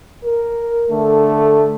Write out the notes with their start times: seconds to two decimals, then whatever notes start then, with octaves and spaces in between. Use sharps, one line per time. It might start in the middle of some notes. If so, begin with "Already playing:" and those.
0.24 A#4
0.91 D3 A3